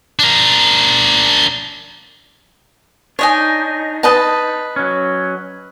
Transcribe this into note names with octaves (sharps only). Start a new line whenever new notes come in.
D4 A#4
D4 D#4 C#5 D#5 G#5
B4 D#5 A5
F#3 C#4